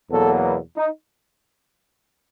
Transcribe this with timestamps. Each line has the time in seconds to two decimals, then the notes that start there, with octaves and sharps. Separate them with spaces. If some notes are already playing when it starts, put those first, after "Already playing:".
0.11 E2 B2 F#3 A#3 A4
0.77 D#4